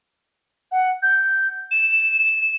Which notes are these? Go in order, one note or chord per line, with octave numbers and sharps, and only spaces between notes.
F#5
G6
E7